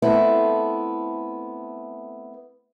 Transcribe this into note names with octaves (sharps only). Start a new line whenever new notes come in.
A3 B3 C4 E4 A4